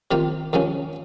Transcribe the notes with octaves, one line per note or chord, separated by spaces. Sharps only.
C3 D#3 A#3 F4 G4
D#2 C#3 F3 G#3 C#4